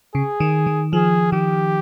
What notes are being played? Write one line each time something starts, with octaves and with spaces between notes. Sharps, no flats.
C#3 G#4
D#3
D#3
F3 G#4
D#3 G4